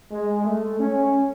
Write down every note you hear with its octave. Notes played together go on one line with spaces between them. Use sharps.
G#3
A3
C#4